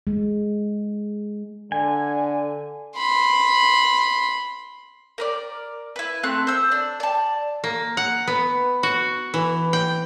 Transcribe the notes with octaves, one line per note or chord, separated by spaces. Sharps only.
G#3
D3 G#5
B5 C6
A#4 B4 D5
E4 B4
A3 C4 F#6
C5 E6
D4
D5 A5
A#3
F#5
B3
F#4
E3
G5